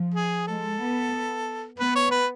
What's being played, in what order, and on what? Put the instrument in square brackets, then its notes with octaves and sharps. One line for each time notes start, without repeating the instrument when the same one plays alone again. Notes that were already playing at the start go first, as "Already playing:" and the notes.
Already playing: [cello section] F3
[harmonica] G#4
[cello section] G#3 [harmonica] A4
[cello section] B3
[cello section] B3 [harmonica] B4
[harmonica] C#5
B4